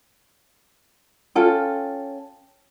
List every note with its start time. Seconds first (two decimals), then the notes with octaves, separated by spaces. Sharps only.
1.35 C#4 F4 A4 G5